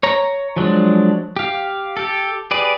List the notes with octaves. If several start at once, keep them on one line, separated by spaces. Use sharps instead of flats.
C#5 A#5
F3 F#3 G#3 D4
G4 F5
G4 A4
G4 G#4 B4 D5